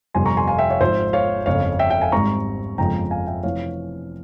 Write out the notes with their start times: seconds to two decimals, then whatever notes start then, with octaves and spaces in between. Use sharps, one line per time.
0.14 G1 F2 C3 G3 G#5 C6
0.25 A#5 C#6
0.37 G#5 C6
0.48 F5 G#5
0.59 E5 G5
0.70 C#5 F5
0.81 G#1 G#2 F3 C5 E5
1.13 C#5 F5
1.46 G1 F2 C#3 C#5 F5
1.79 E5 G5
1.90 E5 G5
2.01 F5 G#5
2.12 G#1 G#2 G3 C4 A#5 C#6
2.78 G1 F2 C#3 F3 G#3 G5 A#5
3.11 F5 G#5
3.27 E5 G5
3.43 F1 F2 E3 C#5 F5